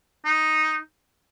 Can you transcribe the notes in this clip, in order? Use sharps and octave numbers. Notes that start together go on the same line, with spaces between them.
D#4